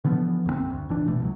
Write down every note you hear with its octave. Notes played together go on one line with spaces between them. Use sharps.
D3 E3 F3 B3
B1 F#2 F#3 C4
D2
G1 E3 D4
F#1 B2 E3 A3
C#2 D3 F#3